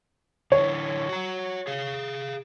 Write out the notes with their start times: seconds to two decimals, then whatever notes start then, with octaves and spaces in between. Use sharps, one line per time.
0.52 D3 E3 C#5
1.09 F#4 A#5
1.67 G#4 F5